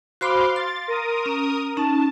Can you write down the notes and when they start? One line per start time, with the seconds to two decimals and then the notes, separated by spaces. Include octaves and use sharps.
0.21 F#4 C5 F5 B5 C6 D6
0.56 C6 A6
0.88 A#4 D#6
1.26 C#4
1.77 C#4 D#4 A5